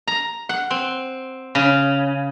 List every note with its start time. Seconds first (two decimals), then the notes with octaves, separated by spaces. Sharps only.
0.07 A#5
0.49 F#5
0.71 C4
1.55 C#3